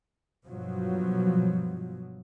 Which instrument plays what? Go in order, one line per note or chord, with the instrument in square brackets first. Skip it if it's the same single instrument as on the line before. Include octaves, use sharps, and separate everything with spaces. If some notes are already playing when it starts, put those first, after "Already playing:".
[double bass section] G2 B2 F3 F#3